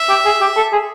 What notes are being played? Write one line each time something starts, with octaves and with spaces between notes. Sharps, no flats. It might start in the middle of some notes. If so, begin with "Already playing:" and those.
Already playing: E5
G4
G#4
G4
A4
G#4